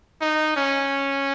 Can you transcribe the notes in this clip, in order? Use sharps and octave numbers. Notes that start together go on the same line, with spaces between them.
D#4
C#4